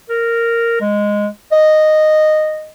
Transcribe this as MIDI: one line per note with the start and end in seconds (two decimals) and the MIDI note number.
0.10 0.78 70
0.81 1.27 56
1.52 2.69 75